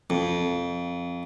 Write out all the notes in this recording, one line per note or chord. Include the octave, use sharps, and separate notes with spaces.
F2